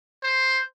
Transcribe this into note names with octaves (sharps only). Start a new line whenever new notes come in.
C5